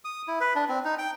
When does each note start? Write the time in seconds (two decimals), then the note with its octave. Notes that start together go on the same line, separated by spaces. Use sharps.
0.05 D#6
0.28 E4
0.41 B4
0.56 D4
0.69 C4
0.85 D#4
0.98 G5